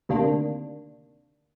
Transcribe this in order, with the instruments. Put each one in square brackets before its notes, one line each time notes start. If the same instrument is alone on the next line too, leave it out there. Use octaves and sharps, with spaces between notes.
[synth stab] D2 C3 D#3 A#3 D4